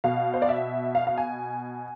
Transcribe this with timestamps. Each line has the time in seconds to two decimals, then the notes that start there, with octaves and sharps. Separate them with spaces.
0.04 B2 F5
0.34 C5
0.42 D5
0.49 E5
0.95 F5
1.07 F5
1.18 G#5